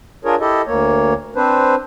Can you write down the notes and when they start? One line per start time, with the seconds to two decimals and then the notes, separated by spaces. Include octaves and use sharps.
0.25 D4 F4 G#4 A#4 C#5
0.40 E4 G4 A4 D#5
0.67 D2 A#3 C#5
1.36 C4 D4 B4 C5